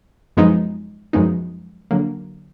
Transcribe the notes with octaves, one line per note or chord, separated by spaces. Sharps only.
F#2 F3 G#3 B3 D#4
F#2 F3 G#3 B3 D#4
D3 F#3 A#3